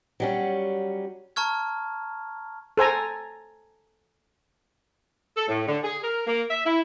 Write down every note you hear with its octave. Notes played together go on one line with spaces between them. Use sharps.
F#3 G3 C#4
A5 A#5 C#6 F6 G#6
A4 C5 G#5 A#5
A4
A2
D3
G#4
A#4
A#3
E5
E4